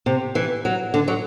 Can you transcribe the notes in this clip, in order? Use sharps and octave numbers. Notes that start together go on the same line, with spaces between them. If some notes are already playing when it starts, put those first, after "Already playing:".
C3
E3
F#3
D3
F#3